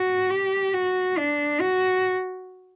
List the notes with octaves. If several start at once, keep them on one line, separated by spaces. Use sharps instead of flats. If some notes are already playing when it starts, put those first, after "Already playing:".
Already playing: F#4
G4
F#4
D4
F#4